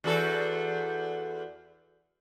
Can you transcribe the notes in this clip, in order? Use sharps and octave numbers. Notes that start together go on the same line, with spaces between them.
E2 F#4 A4